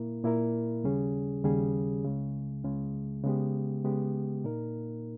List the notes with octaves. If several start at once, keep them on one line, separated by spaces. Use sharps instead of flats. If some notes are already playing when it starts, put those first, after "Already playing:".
Already playing: A#2 A#3 E4 A#4
A#2 A#3 E4 A#4
D#2 C#3 G3 C#4 G#4
D#2 C#3 G3 C#4 G#4
C#2 C#3 G#3
C#2 C#3 G#3
C#3 G#3 B3 G4
C#3 G#3 B3 G4
A#2 A#3 D#4 A#4